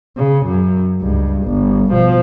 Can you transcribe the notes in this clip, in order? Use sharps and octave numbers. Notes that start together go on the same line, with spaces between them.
C#3
F#2
C#2 G2
G1
B2 F3